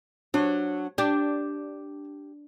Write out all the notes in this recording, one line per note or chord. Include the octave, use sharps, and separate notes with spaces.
F#3 D4
D4 G4